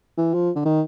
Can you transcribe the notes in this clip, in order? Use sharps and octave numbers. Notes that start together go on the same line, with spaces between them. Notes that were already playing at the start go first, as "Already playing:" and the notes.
E3
F3
D3
D#3